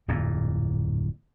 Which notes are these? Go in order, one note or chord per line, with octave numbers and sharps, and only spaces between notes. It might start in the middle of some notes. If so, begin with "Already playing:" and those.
D1 F2 A#2